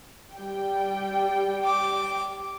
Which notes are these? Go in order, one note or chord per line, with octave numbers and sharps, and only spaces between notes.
G3 G5
D6